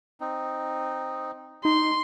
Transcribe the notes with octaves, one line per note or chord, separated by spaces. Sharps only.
C4 D#4
D#4 C6